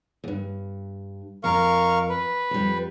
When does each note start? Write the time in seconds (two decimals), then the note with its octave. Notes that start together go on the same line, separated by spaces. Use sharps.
0.24 E2 G2
1.44 F2 A#4 F5 A#5 C#6
2.09 B4
2.51 F2 G3